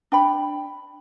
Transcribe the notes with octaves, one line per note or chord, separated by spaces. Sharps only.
D4 G5 B5